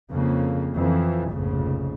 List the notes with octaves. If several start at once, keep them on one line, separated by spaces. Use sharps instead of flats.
F2 C#3 A#3
F2 E3 F3
F1 A#1 F2 G#2 C#3